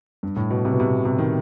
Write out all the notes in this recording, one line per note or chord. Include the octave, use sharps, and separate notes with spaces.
G2
A2
B2
C3
B2
C3
C3
D#3